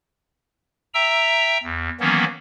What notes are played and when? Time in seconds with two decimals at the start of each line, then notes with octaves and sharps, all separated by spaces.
0.94 E5 G5 A#5 E6
1.63 E2
2.00 D#3 E3 F#3 A#3 B3 C#4